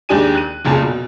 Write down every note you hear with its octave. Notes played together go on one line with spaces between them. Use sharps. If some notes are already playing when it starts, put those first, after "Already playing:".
D#2 G#3 D4 G4 G#5 D#7
F#6 D#7
F1 C#2 A#2 G#4 A5
B2